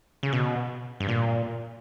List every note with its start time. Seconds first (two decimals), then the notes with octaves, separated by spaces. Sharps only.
0.23 C#3
0.33 B2
1.00 G2
1.08 A#2